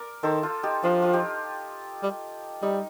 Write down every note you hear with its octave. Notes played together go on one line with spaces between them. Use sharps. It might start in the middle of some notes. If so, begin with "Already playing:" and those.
Already playing: A#4 D5
D#3 A4 C5
F4 A4
D#4 G4
F3 D4 F4
F4
D#4 G4
G3
G3 D#4